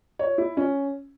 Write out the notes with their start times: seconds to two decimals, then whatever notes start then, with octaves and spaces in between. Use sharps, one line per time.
0.19 C#5
0.38 E4
0.57 C#4